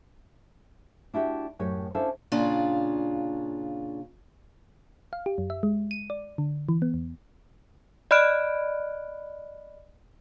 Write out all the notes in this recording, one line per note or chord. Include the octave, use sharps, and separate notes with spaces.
D4 E4 F#4 G4
F#2 A2 G4 C#5
C#4 D4 E4 A4 C5 F5
A#2 C#3 D4 F4
F5
G4
F#2
E5
G#3
D#7
D5
D3
E3
B3
E2
D5 D#5 B5 F6 F#6 D7